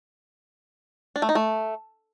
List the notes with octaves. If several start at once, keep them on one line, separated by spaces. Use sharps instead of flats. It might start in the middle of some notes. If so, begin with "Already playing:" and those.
D4
A3
D#4
A3